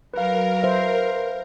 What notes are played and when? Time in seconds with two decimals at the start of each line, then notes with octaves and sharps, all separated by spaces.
0.14 F#3 A#4 B4 F5
0.63 C5 E5